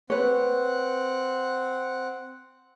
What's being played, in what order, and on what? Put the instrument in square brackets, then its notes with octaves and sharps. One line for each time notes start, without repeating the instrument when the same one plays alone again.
[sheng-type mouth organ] C4 F#5 [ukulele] B4 C#5